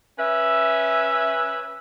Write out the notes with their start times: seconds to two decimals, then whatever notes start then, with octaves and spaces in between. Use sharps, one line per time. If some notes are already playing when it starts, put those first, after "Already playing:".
0.19 C#4 B4 E5